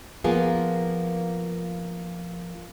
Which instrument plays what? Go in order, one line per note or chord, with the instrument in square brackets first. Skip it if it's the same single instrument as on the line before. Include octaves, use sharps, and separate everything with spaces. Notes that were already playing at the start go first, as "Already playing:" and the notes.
[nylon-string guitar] F3 A#3 B3 F4 G#4